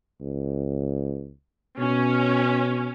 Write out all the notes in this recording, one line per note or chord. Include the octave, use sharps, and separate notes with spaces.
C#2
B2 C#4